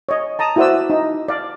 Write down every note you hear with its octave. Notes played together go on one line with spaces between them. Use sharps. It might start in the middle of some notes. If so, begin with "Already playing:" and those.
C#5 D#5
A5 A#5 D#6
E4 F#4 B4 C5 D5 E6
D#4
D5 F5